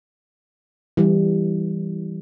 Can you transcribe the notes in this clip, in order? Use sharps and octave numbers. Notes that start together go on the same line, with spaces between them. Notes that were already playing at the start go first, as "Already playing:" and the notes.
E3 G3